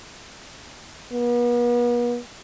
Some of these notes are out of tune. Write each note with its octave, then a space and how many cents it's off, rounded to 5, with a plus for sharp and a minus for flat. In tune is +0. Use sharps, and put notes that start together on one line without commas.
B3 -40